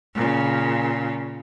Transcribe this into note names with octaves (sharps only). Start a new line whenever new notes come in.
A#2 C#3